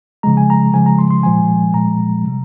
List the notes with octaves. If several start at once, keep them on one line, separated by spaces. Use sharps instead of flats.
C#3 F3 G#3 A#5
G#5
A#5
C#3 F3 G#3 G#5
A#5
C6
C6
A#2 F3 G#3 G#5
A#2 F3 G#3 A#5
C3 G3